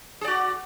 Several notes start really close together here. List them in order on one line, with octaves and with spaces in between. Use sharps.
G#4 D5 F#4